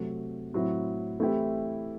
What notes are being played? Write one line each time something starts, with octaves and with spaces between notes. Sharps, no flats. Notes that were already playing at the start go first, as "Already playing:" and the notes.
Already playing: C3 F#3 A3 C4
A2 F#3 C4 E4
E3 A3 C4 E4 G4